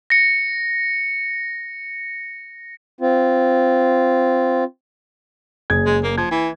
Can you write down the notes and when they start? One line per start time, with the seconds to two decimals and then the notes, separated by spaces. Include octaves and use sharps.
0.10 A#6 C#7
3.01 C4 F4
5.70 F#1 G#4 G#6
5.86 G#3
6.04 A#3
6.18 F3 G#6
6.31 E3